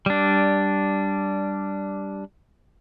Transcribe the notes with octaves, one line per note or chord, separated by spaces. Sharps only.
G3 D4